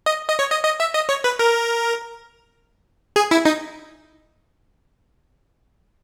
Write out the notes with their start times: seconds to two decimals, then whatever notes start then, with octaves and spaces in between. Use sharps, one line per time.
0.06 D#5
0.28 D#5
0.39 C#5
0.51 D#5
0.65 D#5
0.80 E5
0.95 D#5
1.09 C#5
1.24 B4
1.39 A#4
3.16 G#4
3.31 E4
3.45 D#4